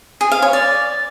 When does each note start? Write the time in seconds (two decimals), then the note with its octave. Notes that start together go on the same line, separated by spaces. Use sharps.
0.21 G#4
0.32 F5
0.42 C#5
0.53 D5